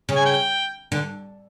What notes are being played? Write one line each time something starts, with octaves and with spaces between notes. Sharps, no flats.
C#3
G#5
G5
D3